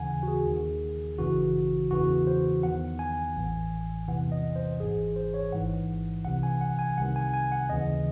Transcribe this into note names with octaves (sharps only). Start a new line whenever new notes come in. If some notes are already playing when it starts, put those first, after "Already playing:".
Already playing: D#2 C#3 E3 F#5 G#5
F#4
G#4
D#2 D#3
G#1 F#2 C#3 E3 F#4
E2 C#3 E3 F#4
C5
E2 D#3 F#5
G#5
A1 A2 E3
E2 C3 E3 F#5
D#5
C5
G#1 G#2 E3 G#4
C5
C#5
A1 G#2 E3 F#5
C2 C3 E3 F#5
G#5
F#5
G#5
C2 C3 D#3 F#5
G#5
G#5
F#5
D#2 C#3 E3 D#5